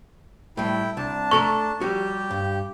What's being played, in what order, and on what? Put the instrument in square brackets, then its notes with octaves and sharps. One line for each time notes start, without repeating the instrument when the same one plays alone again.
[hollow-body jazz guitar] A2 G3 [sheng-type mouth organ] E4 G5
[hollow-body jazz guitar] C2 [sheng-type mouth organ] D4 A5
[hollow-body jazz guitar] A3 A4 A#5 [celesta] C#6
[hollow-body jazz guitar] G3 F#4 [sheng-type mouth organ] G4
[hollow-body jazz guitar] G2